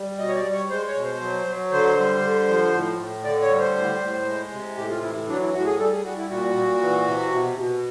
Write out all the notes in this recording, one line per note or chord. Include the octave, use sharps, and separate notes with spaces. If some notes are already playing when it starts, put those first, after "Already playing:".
Already playing: G3
B2 D#5
C#5
D5
G3
C#5
G#3 C5
C#5
B2
C5
F#3
F#3
D3 C5
G3
D3
F3
A2
A2
D3 D5
C#5
G3
C5
A2
A2
G#3
C3
A2 G4
F4
E3 E4
F#3 D4
E4
A2 F#4
G#4
G3 A4
G#4
G3 F#4
E4
A#2 F#4
A#2
E3
C3
B2
B2